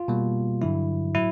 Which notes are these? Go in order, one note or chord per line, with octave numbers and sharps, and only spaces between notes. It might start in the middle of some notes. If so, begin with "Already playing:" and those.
Already playing: F4
B2 G3 A#3
G2 D3 F#3 E4
A2 F#3 E4